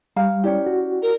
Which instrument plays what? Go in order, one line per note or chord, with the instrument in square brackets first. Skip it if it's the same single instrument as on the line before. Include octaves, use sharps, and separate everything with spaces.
[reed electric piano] G3 [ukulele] F5 [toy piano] G5 G#5 A#5
[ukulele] C#4 G4 [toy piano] E4 D5 G5
[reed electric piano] F#4
[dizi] A#4